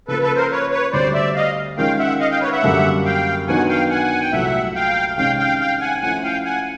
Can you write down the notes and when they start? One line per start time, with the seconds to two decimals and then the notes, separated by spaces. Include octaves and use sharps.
0.08 C#3 F3 A#3 A4 B4
0.22 A4 B4
0.36 A#4 C5
0.51 B4 C#5
0.72 B4 C#5
0.93 D2 D3 G3 C4 C5 D5
1.14 D5 E5
1.35 D#5 F5
1.77 D#3 G#3 C#4 F4 A#4 F5 G5
1.99 E5 F#5
2.20 D#5 F5
2.31 F5 G5
2.41 B4 C#5
2.52 E5 F#5
2.63 F#2 D3 G3 A#3
3.05 F5 G5
3.48 D#3 F#3 B3 D4 F#5 G#5
3.69 F5 G5
3.90 F#5 G#5
4.21 G5
4.33 C2 A#2 F#3 A3 E5 F#5
4.75 F5 G5
5.17 C3 D#3 G#3 C#4 F5 G5
5.39 F5 G5
5.60 F5 G5
5.81 F#5 G#5
6.02 F3 A3 C#4 E4 F#5 G#5
6.23 F5 G5
6.45 F#5 G#5